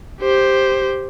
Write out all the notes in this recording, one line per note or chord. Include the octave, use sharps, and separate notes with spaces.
G4 C5